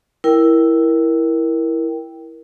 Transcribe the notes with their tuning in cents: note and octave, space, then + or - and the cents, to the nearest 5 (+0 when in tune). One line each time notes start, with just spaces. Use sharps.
E4 +0 A#4 +10 G5 +0